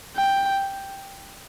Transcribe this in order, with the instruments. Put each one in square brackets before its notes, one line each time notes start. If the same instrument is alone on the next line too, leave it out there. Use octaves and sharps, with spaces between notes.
[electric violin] G5